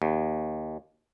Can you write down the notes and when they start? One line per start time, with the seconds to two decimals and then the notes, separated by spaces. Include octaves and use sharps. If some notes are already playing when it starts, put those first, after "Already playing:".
0.02 D#2